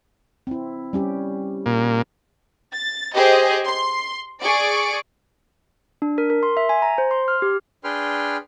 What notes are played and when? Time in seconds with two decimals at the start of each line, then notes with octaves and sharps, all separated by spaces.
0.47 C4 E4
0.93 G3 C#4 G4
1.66 A#2
2.73 A6
3.15 G4 G#4 C5 D#5
3.67 C6
4.41 G#4 D5 C#6 D7
6.02 D4
6.18 A#4
6.30 A#4
6.43 C6
6.57 E5
6.69 G#5
6.82 A#5
6.98 C5
7.11 C6
7.28 F6
7.42 G4
7.84 D4 G#4 B4 G5 C6 F6